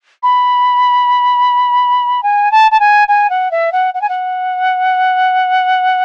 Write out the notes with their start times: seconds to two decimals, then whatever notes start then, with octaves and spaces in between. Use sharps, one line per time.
0.23 B5
2.23 G#5
2.51 A5
2.71 A5
2.80 G#5
3.08 G#5
3.29 F#5
3.51 E5
3.72 F#5
3.94 F#5
4.01 G#5
4.09 F#5